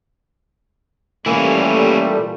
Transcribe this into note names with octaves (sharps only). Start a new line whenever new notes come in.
A#2 E3 G3 A3 A#3 C#4 E4